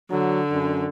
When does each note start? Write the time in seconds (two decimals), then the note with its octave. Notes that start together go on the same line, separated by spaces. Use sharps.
0.10 D3 F#3
0.51 F#2